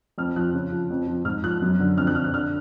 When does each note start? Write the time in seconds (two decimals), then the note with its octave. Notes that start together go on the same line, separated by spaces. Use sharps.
0.18 F2 F6
0.36 F3 F#6
0.53 C#3
0.72 F3
0.90 F2
1.07 F3
1.25 G#2 F6
1.43 F3 F#6
1.62 F#2
1.80 D3
1.97 F2 F6
2.07 F#6
2.15 D3 F6
2.24 F#6
2.34 D3 F6